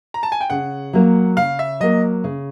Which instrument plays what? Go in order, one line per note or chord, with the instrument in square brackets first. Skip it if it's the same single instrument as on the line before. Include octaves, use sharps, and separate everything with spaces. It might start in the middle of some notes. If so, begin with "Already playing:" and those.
[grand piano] A#5
A5
G#5
G5
[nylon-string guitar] C#3 [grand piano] F#5
[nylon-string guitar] F#3 A#3
[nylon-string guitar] C#3 [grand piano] F5
[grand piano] E5
[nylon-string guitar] F#3 A#3 [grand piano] D#5
[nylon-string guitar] C#3